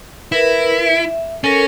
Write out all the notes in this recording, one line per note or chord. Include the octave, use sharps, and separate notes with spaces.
E4 A#4 B4
E5
C#4 A4 A#4